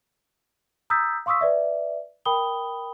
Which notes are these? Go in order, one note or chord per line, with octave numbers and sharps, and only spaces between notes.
A#5 D#6 E6 G6 A6 B6
F5 C6 C#6 D#6 E6 B6
B4 D5 E5
A#4 G5 B5 D#6 G7